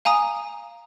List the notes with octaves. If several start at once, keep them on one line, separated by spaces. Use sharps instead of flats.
F5 G#5 A#5 D#6